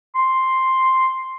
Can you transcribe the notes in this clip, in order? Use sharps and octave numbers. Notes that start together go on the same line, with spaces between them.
C6